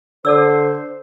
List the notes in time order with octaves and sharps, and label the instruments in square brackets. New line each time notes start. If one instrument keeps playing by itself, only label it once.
[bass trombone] D3 [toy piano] A4 D5 E6 [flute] C5